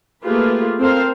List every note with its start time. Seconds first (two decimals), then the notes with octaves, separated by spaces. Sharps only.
0.23 A3 A#3 F4 G4 G#4 B4
0.78 C4 A4 A#4 C5 F5